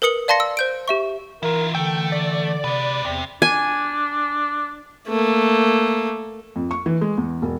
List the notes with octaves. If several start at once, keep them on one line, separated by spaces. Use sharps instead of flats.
A#4 B4 D#6 C#7 F#7
D5 F5 A5 C6 A#6 C#7
E6
C5 G6 D7
G4 E5 C#6
E3 E4 F4 A#4
D3 A3 G5
D5
C3 G#3 B4
E2 C3
D4 G#5
A3 A#3
F2
C#6
E3
G#3
E2
E1